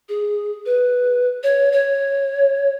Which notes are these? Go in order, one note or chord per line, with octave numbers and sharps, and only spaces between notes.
G#4
B4
C#5
C#5